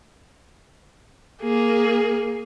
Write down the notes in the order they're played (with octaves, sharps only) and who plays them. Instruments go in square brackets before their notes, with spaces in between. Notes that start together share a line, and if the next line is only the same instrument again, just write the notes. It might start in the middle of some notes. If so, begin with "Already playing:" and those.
[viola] A#3 G#4